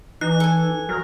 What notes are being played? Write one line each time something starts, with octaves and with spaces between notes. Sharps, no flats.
E3 D#4 F#6
A4 G#5
F#3 A#4